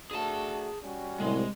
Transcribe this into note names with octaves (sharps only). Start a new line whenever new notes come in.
A3 D4 F#4 G#4 A5
G3 C#4 F#4
C2 A2 G#3